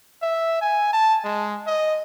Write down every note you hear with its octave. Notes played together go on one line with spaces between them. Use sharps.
E5
G#5
A5
G#3
D#5